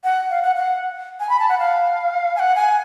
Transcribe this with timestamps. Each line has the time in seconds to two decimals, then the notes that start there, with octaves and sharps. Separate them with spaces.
0.04 F#5
0.30 F5
0.42 F#5
0.55 F#5
1.20 G#5
1.29 B5
1.40 A5
1.49 F#5
1.59 F5
2.36 G#5
2.40 F#5
2.55 G#5